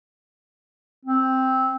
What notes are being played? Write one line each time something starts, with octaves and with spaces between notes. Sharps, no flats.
C4